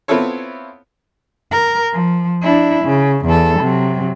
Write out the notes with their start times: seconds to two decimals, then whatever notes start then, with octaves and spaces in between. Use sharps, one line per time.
0.08 B3 C4 E4 F4 A4 C#5
1.52 A#4
1.93 F3
2.42 D4 E4
2.85 C#3
3.26 E2 A4
3.60 C3 F#3